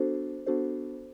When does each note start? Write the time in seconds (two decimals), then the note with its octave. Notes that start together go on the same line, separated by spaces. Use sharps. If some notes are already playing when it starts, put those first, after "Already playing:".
Already playing: B3 D4 F#4 A4 C5
0.47 B3 D4 F#4 A4 C5